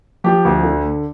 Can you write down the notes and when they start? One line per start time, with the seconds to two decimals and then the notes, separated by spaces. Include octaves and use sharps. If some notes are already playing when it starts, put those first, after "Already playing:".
0.24 F3 G4
0.45 D2
0.63 D3